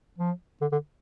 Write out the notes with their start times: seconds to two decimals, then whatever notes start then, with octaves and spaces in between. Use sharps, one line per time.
0.18 F3
0.61 D3
0.72 D3